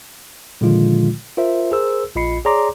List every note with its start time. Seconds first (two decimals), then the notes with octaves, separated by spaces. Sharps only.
0.61 A#2 D3 D#3 F3 G#3 F4
1.37 F4 A#4 C5 E5
1.72 G#4 A#4 C5 E6
2.15 A#1 F4 D#5 B5 C7 C#7
2.45 G#4 C#5 D5 A#5 C6 D6